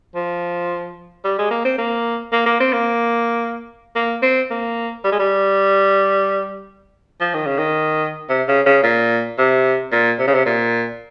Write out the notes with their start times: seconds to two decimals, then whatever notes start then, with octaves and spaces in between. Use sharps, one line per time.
0.15 F3
1.25 G3
1.39 G#3
1.51 A#3
1.65 C4
1.78 A#3
2.33 A#3
2.46 A#3
2.60 C4
2.73 A#3
3.96 A#3
4.22 C4
4.50 A#3
5.04 G3
5.12 G#3
5.19 G3
7.20 F3
7.34 D#3
7.46 C#3
7.58 D#3
8.29 C3
8.48 C#3
8.66 C#3
8.83 A#2
9.38 C3
9.92 A#2
10.19 C3
10.28 C#3
10.34 C3
10.46 A#2